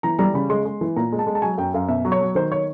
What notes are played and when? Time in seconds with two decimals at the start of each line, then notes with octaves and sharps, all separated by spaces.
0.03 E3 A#5
0.19 G3 A#5
0.34 C#3 B5
0.50 G#3 C6
0.65 G#3
0.81 E3
0.96 A#2 A#5
1.12 G#3
1.19 A5
1.27 G#3
1.35 A5
1.42 F#3 G#5
1.58 F#2 G5
1.74 F#2 F5
1.89 B2 E5
2.05 F#3
2.12 C#5
2.21 F#3
2.35 D#3 C5
2.52 C#5